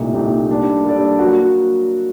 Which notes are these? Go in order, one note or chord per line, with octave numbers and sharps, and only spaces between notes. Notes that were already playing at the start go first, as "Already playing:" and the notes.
Already playing: C2 A#2 A3 D#4 G4
C2 A#2 A3 D#4 G4
G3 A#3 D4 A4 D5
G3 A#3 D4 A4 D5
F#3 A#3 F#4